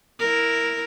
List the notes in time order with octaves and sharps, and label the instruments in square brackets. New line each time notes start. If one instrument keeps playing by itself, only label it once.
[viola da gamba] E4 A#4